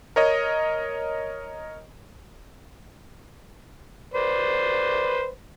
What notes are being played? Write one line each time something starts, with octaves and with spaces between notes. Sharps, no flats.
A#4 C#5 D#5
B4 C5 D5